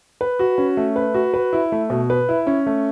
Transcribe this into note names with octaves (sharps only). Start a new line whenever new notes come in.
B4
F#4
C#4
A3
B4
F#4
B4
E4
A3
B2
B4
E4
C#4
A3